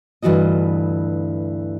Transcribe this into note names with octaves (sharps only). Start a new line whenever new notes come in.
D2 G2 E3 F4 F#4 D#5